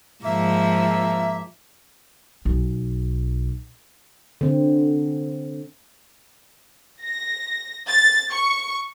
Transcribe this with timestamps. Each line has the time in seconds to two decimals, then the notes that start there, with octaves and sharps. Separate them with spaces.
0.24 G#2 F3 A#3 E5
2.45 B1
4.41 D3 C4
7.02 A#6
7.88 A6
8.32 C#6